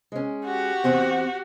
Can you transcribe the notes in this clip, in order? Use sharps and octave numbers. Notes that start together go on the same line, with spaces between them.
G#3 C#4
F#4 G4
E2 C4 F#5